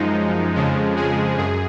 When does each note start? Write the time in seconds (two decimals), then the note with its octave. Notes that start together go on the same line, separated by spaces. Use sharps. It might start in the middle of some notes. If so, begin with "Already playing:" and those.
Already playing: F#2 F3 G#3 D#4
0.55 F2 C#3 F3 G#3
0.96 G#3 G#4
1.38 F#2 G#4